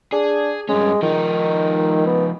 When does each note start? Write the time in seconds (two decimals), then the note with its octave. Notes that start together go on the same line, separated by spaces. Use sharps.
0.12 D4 G#4
0.69 G2 G#3 C#4
1.02 D#3 F3 D#4
2.07 B3